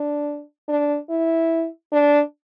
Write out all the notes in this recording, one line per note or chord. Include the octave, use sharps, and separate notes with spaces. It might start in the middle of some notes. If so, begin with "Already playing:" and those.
Already playing: D4
D4
E4
D4